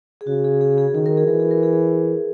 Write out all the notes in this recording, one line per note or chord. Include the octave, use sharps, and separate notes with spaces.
G#4
C#3 F#4
G#4
G#4
G#4
D#3 G#4
A#4
G#4
E3 A#4
G#4
A#4
G#4